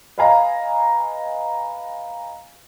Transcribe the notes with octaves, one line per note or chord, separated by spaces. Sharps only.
B4 D#5 F5 G#5 A#5